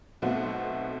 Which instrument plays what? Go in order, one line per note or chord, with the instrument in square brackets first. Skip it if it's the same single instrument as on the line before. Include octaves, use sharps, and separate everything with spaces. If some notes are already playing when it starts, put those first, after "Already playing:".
[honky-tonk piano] B1 B2 A3 C4 F#4